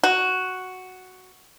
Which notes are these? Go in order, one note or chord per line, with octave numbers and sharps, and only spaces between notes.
F#4